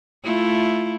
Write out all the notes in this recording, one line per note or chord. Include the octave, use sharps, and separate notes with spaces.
A3 E4 F4